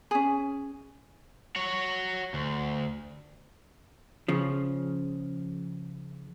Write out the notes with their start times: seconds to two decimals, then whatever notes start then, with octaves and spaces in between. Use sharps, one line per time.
0.11 C#4 G#4
1.56 F#4 C#5
2.34 D2
4.28 C#3 F3